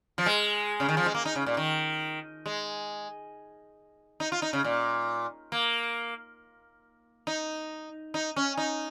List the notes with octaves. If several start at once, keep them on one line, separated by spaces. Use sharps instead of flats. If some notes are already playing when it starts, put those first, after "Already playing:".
F3
G#3
C#3
D#3
F3
G#3
A#3
D#4
C#3
A#2
D#3
G#3
D#4
F4
D#4
C#3
A#2
A#3
D#4
D#4
C#4
D#4